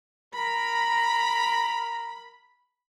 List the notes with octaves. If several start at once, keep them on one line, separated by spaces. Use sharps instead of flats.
A#4 A#5 B5